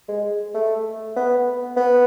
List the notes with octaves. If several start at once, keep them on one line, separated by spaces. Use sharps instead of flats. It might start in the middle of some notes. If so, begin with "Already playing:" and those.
G#3
A3
B3
B3